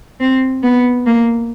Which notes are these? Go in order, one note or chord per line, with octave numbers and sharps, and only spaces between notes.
C4
B3
A#3